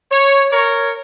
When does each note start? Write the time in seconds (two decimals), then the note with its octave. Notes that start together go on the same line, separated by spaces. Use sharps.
0.11 C#5
0.52 A#4 C#5